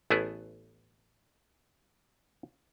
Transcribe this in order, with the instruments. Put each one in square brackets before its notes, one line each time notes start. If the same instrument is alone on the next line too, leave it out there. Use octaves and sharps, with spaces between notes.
[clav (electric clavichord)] A1 A3 B3 E4 G#4